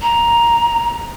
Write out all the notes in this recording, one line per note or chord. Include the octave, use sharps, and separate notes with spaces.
A#5